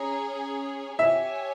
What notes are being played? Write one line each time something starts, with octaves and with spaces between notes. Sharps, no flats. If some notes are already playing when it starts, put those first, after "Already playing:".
Already playing: C#4 G#4 C#5 A#5
G4 C#5 E5 G#5